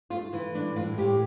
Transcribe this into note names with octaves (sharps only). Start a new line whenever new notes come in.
A3 F4
E3 E4
A2 D4
A2 F4
A2 G4